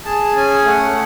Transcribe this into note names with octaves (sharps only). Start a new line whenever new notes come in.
G#4 A5
C#4 G#5
A3 F#5